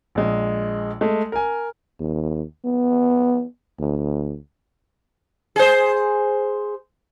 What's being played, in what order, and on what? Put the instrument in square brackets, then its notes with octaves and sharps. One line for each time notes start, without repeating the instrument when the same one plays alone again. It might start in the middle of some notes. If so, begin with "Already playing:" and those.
[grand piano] A#1 G#3
G#3 A3
A#4 G#5
[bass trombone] D#2
B3
D2
[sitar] G#4 C5